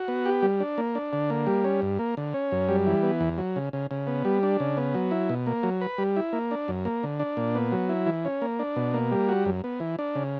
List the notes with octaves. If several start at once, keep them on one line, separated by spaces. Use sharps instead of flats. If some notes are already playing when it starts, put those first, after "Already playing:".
Already playing: F#4
B3
G4
G3
D4
A#3
D4
D3
A#3
G3
C#4
G2
A#3
D3
C#4
F#2
G3
E3
B3
E2
F#3
C#3
C#3
C#3
B3
G3
D4
C#3
B3
F#3
E4
B2
A#3
F#3
B4
G3
E4
A#3
D4
F#2
A#3
D3
D4
A#2
B3
F#3
E4
E3
C#4
A#3
D4
B2
A#3
G3
F#4
F#2
B3
E3
D4
C#3